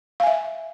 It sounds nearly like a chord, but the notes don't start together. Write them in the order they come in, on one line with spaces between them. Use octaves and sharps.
F5 G#5 E5